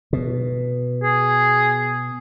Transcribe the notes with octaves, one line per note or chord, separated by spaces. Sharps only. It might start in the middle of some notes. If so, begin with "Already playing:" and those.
B2
G#4